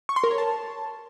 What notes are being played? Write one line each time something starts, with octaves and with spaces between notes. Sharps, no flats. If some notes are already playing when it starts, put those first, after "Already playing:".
C#6
C6
A#4
C#5
A5